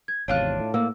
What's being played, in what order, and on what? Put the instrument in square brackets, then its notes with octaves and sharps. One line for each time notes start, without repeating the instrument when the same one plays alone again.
[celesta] G#6
[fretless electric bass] G#1 E2 C3 [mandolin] D4 F4 F#6 [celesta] C#5
[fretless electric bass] A2
[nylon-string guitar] A#3 [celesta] E6